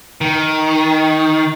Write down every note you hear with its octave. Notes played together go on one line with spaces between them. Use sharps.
D#3